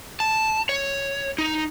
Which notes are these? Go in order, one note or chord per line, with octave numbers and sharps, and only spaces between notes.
A5
C#5
D#4